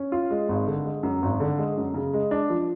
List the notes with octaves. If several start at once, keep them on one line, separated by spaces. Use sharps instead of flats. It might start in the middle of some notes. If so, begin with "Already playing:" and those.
Already playing: C#4
F4
G#3
G#1
D3
G#3
F#2
G#1
D3
G#3
F#2
C#3
G#3
D4
F3